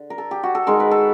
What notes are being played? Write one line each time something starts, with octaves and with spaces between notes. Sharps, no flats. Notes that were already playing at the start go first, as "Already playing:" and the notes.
Already playing: D3
A#4
A4
G4
F#4
A4
D#3 G#3 A#4
B4
A4